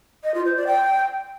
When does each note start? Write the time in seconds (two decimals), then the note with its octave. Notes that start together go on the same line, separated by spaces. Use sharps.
0.24 D#5
0.34 F4
0.45 C5
0.56 D5
0.67 G5